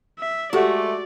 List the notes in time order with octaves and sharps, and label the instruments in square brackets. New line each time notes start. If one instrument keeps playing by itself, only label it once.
[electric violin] E5
[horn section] G#3 A3 [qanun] F#4 [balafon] G4 A4 F#5 [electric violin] D5